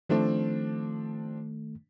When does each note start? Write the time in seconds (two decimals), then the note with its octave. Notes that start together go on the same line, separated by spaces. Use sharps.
0.09 D#3 F3 A3 C4 D4